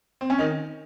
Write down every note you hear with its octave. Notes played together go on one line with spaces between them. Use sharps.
C4
C#4
D#3 D#4